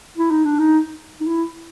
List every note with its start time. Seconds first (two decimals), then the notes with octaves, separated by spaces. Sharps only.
0.18 E4
0.31 D#4
0.45 D4
0.59 D#4
1.21 D#4
1.27 E4